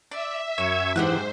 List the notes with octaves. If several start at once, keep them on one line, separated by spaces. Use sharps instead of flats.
D5 E5
F#2 C#5 C#6 E6 G#6
G#2 E3 G4 C5 F#5 F#6